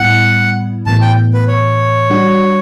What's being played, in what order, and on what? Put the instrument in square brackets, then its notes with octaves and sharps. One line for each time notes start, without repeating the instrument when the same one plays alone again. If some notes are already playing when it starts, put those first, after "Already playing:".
Already playing: [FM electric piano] A2 G3 B3 E4 [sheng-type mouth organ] F#5
[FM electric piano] A2 E3 B3 [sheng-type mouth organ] A5
[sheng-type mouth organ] G5
B4
C#5
[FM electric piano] G3 D4 F#4